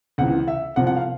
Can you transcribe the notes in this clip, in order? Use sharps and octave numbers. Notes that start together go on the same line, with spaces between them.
C#2 C3 E3 F#5
E5
C2 C3 F3 F#5
F#5
F5